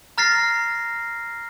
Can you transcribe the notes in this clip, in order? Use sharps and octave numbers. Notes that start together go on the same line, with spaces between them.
A#5 F6 A6 A#6 C7